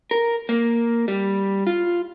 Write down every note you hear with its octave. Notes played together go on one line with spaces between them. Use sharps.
A#4
A#3
G3
F4